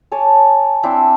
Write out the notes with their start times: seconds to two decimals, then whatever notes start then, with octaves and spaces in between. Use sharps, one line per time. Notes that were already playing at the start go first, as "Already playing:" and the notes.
0.12 C#5 G#5 A5 D6
0.83 C4 D4 E4